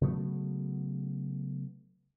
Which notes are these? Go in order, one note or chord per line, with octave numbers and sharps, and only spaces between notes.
C#3 F#3 A3 B3